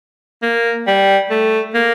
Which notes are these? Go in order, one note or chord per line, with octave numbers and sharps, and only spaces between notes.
A#3
G3
A3
A#3